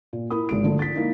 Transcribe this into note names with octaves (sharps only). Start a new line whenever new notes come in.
A#2
E4 A#4 B5 D#6
G#1 G#3 D7
D3 F3 A3
A6 B6
A#3 D#4 E4